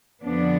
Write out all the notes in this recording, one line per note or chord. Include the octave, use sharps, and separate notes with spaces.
F2 D3 B3 D4